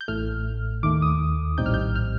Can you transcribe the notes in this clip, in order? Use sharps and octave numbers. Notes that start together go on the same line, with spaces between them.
G6
A1 A2 A3 F6
D#2 D#3 A3 D6
D#6
A#1 A2 G3 C4 D#4 G6
F6
G6
F6